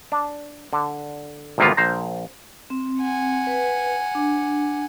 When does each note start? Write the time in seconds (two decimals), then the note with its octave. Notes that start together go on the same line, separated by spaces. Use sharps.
0.12 D4
0.73 D3
1.58 G#1 D2 C3 A#3 B3 F4
1.77 A#1 C5 A#5
2.70 C4
3.00 F#5 G#5
3.47 B4
4.15 D4